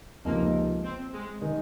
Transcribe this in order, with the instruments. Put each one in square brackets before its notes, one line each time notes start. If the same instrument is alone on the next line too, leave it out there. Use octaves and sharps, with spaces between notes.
[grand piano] C#2 C3 F3 C4 D#4 [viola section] A#3
[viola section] C4
G#3
[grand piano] D#3 G#3 D#4